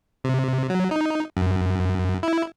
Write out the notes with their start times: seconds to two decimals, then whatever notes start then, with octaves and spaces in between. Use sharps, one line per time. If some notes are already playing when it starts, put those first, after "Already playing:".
0.24 C3
0.70 F#3
0.91 D#4
1.37 F#2
2.23 E4